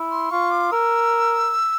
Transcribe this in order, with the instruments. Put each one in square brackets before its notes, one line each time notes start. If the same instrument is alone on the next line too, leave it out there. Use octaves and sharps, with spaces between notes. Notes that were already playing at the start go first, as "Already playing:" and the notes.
Already playing: [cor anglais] E4
[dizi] C6
[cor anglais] F4 [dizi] C#6
[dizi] D6
[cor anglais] A#4 [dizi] E6